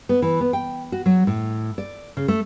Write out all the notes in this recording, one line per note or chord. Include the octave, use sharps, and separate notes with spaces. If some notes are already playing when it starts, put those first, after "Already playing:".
B3
E3
B3
G5
F#4
F#3
A2
D5
C#3
A3